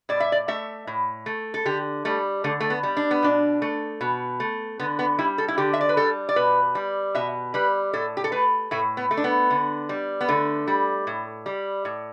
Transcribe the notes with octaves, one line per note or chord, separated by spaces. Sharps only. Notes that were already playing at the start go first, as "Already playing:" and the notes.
A2 D5
E5
D5
A3 E5
A2
A3
A4
D3 G4
G3 A3
D3 A3
A3
B3
G3
D4
B3
B2 D4
A3
B2
A3
D3 B3
B3
G3 E4
A4
E4
D3 G4
E5
D5
B4
G3 A4
D5
B2 B4
G3
B2 E5
G3 B4
A2 A4
G4
A4
A3 B4
A2 A3
B3
A3
D4
B3
D3
G3
B3
D3 A3
G3
A2
G3
A2